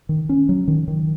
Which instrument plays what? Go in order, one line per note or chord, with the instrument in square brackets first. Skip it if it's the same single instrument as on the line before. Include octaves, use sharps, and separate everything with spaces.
[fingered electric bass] D#3
C#4
F#3
D#3
D#3